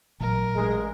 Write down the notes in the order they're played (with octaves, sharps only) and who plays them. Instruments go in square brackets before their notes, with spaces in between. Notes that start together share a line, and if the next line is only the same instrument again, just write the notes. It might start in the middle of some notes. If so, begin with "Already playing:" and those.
[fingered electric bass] A1 [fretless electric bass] A#2 F#3 [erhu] A#4
[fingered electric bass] A1 [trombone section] G2 G#3